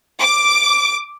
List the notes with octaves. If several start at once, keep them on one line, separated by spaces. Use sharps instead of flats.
D6